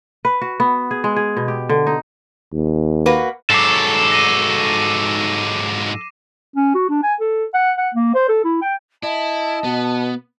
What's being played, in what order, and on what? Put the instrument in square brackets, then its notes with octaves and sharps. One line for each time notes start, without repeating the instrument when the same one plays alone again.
[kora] B4
F#4
B3
G#4
G#3
G#4
B2
G4
D3
D#4
[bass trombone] D#2
[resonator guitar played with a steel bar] A#3 F#4 B4
[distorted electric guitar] G#2 F#3 [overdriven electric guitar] A4 [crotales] D6 C7 E7
[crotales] A#6 D#7
[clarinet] C#4
F#4
D4
G#5
A4
F#5
F#5
A#3
C5
A4
E4
G5
[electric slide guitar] E4 [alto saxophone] D#5 [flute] A5
[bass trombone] B2 [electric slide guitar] B3